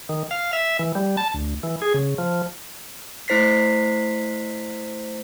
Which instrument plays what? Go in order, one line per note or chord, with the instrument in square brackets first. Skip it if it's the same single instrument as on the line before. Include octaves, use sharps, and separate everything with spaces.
[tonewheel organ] D#3
F5
E5
E3
G3
A5
D2
E3
G#4
C#3
F3
[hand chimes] A3 E4 C5 B6 C7